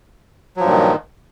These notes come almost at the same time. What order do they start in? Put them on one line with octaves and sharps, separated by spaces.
F#3 F3 G2 A#2 D#3